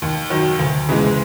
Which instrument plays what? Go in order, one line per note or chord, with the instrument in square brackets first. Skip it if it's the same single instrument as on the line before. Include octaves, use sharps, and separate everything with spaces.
[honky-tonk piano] D#2
D#3 F#3
D2
C#3 E3 G#3